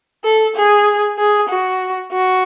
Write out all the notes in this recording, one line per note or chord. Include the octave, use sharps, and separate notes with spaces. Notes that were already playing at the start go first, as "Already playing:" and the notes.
A4
G#4
G#4
F#4
F#4